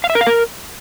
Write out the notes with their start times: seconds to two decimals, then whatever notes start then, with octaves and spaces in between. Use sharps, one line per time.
0.04 F5
0.10 E5
0.15 A#4
0.21 F5
0.27 A#4